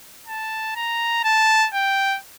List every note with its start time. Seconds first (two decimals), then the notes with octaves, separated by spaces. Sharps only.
0.27 A5
0.76 A#5
1.24 A5
1.74 G5